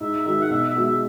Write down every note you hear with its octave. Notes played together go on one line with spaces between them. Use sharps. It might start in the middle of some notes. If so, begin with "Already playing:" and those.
G#2 E5
D#3 G#3 D#4 F#4 E5
F#5
B2 E5
E5
G#3 B3 F#4
E5